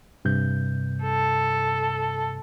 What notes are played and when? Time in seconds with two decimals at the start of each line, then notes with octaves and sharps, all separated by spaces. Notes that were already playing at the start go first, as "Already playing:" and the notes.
0.25 G2 C3 G6
1.03 A4